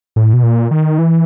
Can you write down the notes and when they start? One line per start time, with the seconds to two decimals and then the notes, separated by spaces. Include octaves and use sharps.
0.16 A2
0.33 B2
0.43 A#2
0.71 D#3
0.98 E3